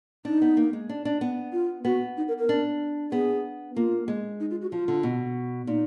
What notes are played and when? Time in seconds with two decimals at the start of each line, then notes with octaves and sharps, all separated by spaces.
0.25 D4 D#4
0.42 B3
0.57 A#3
0.73 G#3
0.89 D4
1.05 D4
1.21 B3
1.52 F4
1.85 B3 F#4
2.17 D#4
2.28 A#4
2.39 A#4
2.49 D4
3.12 B3 G#4
3.76 A#3 F4
4.08 G#3
4.40 D#4
4.50 F4
4.61 F#4
4.71 F3 F4
4.88 D3
5.03 B2
5.67 A#2 D#4